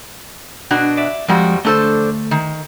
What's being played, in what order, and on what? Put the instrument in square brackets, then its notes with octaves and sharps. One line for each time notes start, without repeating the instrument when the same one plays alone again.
[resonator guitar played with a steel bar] B2 D4 F#4
[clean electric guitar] D5 E5
[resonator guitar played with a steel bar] F2 G3 F#4 [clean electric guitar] F3 G#3
[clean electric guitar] D2 A3 [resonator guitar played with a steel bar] D4 A4 C5
[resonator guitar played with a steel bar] D#3